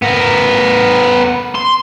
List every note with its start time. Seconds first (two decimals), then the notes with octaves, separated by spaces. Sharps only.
0.02 B3 A#4
1.55 C6